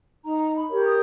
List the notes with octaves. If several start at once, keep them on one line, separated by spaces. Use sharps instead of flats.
D#4 A#5
B5
G4 A#4 C#5
D#6